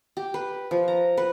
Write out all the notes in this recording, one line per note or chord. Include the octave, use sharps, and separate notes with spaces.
G4
B4
F3
A#5
B4